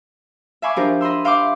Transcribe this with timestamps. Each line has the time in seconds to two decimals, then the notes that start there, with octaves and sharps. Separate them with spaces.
0.62 E5 F5 G#5 B5 C#6 D6
0.76 F3 D4 D#4 G4 A#4 C5
1.01 D#5 B5 C6 E6
1.24 E5 F5 G5 B5 C6 D6